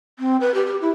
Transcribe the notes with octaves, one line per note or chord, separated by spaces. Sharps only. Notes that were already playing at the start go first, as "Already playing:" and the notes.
C4
B4
G4
G4
E4